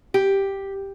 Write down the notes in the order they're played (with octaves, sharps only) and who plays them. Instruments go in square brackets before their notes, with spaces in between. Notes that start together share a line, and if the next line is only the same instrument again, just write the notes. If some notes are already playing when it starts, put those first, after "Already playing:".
[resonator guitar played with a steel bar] G4